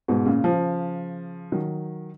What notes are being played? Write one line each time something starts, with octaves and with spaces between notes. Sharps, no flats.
G#2 B2
A#2 C#3
C#3 F3
D#3 F#3